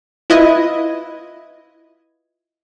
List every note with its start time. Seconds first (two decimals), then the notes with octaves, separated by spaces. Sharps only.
0.30 E4 F4 B4 D#5 G#6